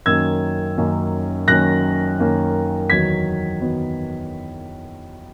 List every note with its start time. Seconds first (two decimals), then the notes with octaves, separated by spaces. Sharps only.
0.06 F#2 D#3 A#3 C#4 E6 G#6
0.77 F#2 D#3 A#3 C#4
1.48 F#2 D#3 A#3 C#4 F#6 A#6
2.20 F#2 D#3 A#3 C#4
2.90 E2 D#3 F#3 B3 G#6 B6
3.61 D#3 F#3 B3